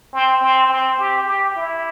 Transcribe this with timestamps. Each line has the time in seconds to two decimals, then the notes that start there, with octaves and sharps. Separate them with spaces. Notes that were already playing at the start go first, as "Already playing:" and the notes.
0.13 C4
0.42 C4
0.70 C4
0.99 G4
1.26 G4
1.56 E4